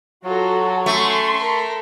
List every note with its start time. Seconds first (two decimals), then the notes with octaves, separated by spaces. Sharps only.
0.24 F#3 F4 F#4 A4
0.86 A3 C#4 C6
1.36 A4 A#4